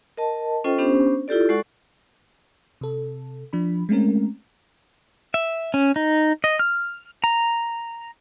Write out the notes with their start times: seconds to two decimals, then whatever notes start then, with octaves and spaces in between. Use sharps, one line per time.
0.17 A#4 D#5 A5
0.64 C#4 F4 A4 C5 D#5 G5
0.79 B3 C#4 D4 G4 C5
1.28 E4 F4 G4 A4 D5
1.49 G#3 F#4 A4 D5 F#5 C#6
2.81 C3 A4
3.53 F3 D4 B5
3.89 G#3 A3 C4 C#4 A#4
5.34 E5
5.74 C#4
5.96 D#4
6.44 D#5
6.59 F6
7.24 A#5